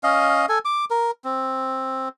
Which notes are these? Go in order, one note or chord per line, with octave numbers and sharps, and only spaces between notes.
C#4 D#5 F5
A4 G#5
D6
A#4
C4